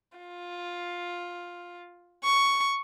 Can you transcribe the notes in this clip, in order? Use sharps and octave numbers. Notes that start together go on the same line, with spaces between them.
F4
C#6